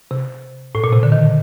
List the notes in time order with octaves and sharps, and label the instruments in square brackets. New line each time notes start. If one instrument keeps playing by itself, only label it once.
[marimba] C3
A2
A#2
C3
D3
D#3